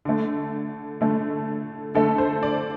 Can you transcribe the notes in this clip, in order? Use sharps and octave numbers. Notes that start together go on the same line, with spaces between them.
D3 A3
D3 A3
D3 A3 A4
C5
D5